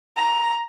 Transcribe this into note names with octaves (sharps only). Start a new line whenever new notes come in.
A#5